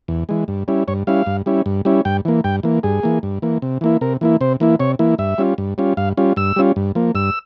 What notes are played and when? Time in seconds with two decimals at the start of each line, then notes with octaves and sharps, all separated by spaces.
0.08 E2
0.29 E3 G#3
0.48 G2
0.68 G3 C#4 E4
0.88 G2 C#5
1.07 G3 C#4 E4 F5
1.26 G2
1.46 G3 C#4 E4
1.66 G2
1.85 G3 C#4 E4
2.05 G2 G5
2.25 E3 A#3
2.44 G2 G5
2.63 E3 A#3
2.83 G2 G#4
3.03 E3 A#3
3.23 G2
3.42 E3 A#3
3.62 C3
3.81 E3 A#3 E4
4.01 C3 A#4
4.21 E3 A#3 E4
4.41 C3 C5
4.60 E3 A#3 E4
4.80 C3 C#5
4.99 E3 A#3 E4
5.18 G2 E5
5.38 G3 C#4 F4
5.58 G2
5.78 G3 C#4 F4
5.97 G2 F5
6.17 G3 C#4 F4
6.36 G2 E6
6.56 G3 C#4 F4
6.76 G2
6.95 F3 A#3
7.15 G2 E6